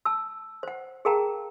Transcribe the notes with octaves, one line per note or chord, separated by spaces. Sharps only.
A5 E6
C5 F#5
G#4 A#4 F5 G5 A5 A#5